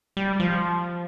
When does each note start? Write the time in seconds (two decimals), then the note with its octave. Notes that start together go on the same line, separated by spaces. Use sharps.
0.17 G3
0.40 F3